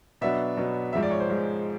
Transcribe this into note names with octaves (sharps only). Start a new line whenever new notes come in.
B2 F#3 B3 D4 E5
B2 F#3 B3 D4
G#2 F3 G#3 E5
D5
C#5
C5
G#2 F3 G#3